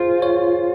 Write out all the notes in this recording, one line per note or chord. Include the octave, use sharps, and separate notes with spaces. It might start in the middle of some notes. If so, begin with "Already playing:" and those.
Already playing: F4 G#4 C5
C#5